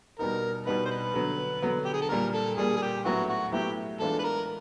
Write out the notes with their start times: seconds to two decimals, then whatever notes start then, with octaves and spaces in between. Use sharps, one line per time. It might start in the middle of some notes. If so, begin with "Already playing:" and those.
0.19 B2 G3 B3 D#4 A#4
0.66 B2 G3 B3 D#4 B4
0.85 C5
0.90 B4
1.14 D3 F#3 B3
1.62 D3 F#3 B3
1.85 G4
1.94 G#4
2.02 A4
2.09 A#2 G3 A#3 A#4
2.34 A4
2.57 A#2 G3 A#3 G#4
2.76 G#4
2.82 G4
3.05 A2 F#3 B3 E4 F#4
3.29 F#4
3.52 A2 F#3 B3 E4 G4
4.00 E3 G#3 B3 D4 F4 A4
4.19 B4
4.24 A#4